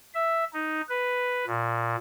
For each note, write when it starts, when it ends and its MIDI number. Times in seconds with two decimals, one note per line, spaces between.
0.15 0.45 76
0.53 0.81 63
0.89 1.45 71
1.47 1.96 46